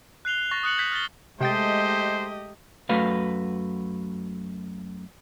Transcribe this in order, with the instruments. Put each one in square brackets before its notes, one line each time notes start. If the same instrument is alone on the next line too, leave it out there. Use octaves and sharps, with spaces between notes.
[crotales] F#6 C7 F7 G7
C#6 A6 A#6
D#6 F#6 C#7 F#7
G6 G#6 B6
F6 A6 G7
[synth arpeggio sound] C3 G5 A6 [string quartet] G#3 A3 [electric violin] G4 D#5 [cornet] C5
[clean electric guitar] F#2 A3 F#4 B4 F5